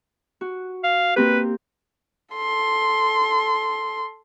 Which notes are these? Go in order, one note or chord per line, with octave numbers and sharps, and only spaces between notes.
F#4
F5
A#3 C4 G4 B4
A4 C6